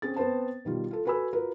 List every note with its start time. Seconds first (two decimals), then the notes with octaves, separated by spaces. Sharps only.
0.02 C4 C#4 G#4 A6
0.16 B3 C4 B4 C5 A5
0.65 B2 D#3 G3 F4
0.91 F4 A4
1.05 F#4 A4 B4 G#5 B5 E6
1.33 F4 F#4 A#4 B4